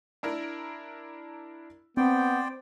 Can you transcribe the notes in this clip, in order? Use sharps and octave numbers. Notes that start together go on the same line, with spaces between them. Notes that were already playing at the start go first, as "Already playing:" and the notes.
D4 E4 A#4
B3 C4 C5 D5 G5